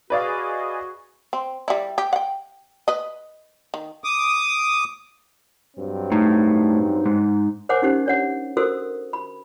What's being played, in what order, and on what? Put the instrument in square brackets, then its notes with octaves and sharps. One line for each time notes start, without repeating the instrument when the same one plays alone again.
[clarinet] F#4 [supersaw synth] G#4 D#5 [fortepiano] B4 D5 F5
[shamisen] C4
G3 E4
G4
F#5 G5
B4 D#5
D#3
[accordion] D6 D#6
[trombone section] G2 F#3 C4
[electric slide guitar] A2 [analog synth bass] D#4
[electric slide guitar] G#2
[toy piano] A#4 C5 C#5 F#5 G#5 D6
C#4 D#4 G4 C5
D4 C#5 F#5
F#4 A4 A#4 C5 D#6 E6
B5